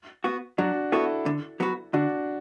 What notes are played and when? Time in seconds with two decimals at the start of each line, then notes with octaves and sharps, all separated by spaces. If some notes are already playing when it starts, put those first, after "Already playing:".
0.24 B3 F#4
0.58 F#3 D4 F#4
0.92 B3 E4 F#4 A4
1.26 D3
1.60 F#3 B3 F#4 B4
1.93 D3 D4 F#4